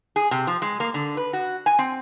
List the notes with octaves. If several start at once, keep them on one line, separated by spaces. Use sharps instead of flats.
G#4
C3
F3
G#3
A#3
D3
B4
F#4
G#5
C4